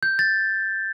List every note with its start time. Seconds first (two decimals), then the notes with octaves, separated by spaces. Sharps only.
0.03 G6
0.19 A6